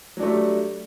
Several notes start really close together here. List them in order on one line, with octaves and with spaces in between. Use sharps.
F#3 D4 A3 G3